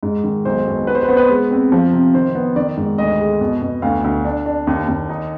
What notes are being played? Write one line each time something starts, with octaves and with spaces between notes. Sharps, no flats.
G#2
D#3
B1 C5
B2
B3 B4
C5
B4
B3 C5
B4
G#3
C4
F3
C3
D#3 C5
B3
D#3 D5
G#2
D2 D#5
G#3
B2
B2
D2 F5
D2
D4
D4
D#2
D#2
D#4